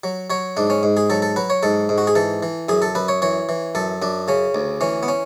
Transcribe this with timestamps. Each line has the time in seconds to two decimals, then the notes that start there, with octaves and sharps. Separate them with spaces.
0.04 F#3
0.30 F#3 C#5
0.57 G#2 D4
0.70 C#4
0.83 G#2
0.97 G#4
1.10 F#3 A4
1.22 A4
1.36 F#3 B4
1.50 C#5
1.63 G#2 A4
1.89 G#2
1.98 F#4
2.07 G#4
2.15 E3 A4
2.43 E3
2.68 F#2 G#4
2.82 A4
2.95 F#2 B4
3.08 C#5
3.22 E3 C#5
3.49 E3
3.75 F#2 A4
4.02 F#2 D4
4.28 C#3 C#4
4.55 D2
4.81 E3 C#4
5.03 B3
5.08 C#4